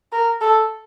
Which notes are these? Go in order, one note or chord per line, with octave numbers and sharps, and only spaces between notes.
A#4
A4